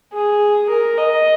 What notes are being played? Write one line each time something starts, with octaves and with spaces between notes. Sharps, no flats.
G#4
A#4
D#5